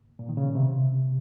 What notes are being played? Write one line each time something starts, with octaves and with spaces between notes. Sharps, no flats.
A#2
D#3
C#3
C3